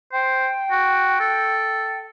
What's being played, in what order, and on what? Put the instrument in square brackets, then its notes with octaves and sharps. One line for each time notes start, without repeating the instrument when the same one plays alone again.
[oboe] C5 [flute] G5
[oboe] F#4
A4